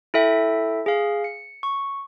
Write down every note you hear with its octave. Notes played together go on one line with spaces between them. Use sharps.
E4 A4 E5 G5
G#4 F5
C#7
C#6